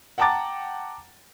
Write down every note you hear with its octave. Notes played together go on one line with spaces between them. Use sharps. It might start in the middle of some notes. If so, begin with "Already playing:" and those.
F#5 G5 A5 A#5 D6 A6